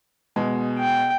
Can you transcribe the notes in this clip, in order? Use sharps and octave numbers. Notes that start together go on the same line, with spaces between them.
B2 G#3
G5